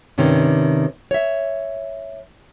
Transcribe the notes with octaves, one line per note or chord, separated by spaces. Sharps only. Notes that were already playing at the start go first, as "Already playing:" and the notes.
G2 C3 D#3 C#4
C#5 E5